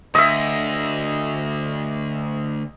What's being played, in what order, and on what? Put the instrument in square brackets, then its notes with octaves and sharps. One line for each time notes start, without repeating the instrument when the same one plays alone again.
[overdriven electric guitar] D2 [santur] D#5 E5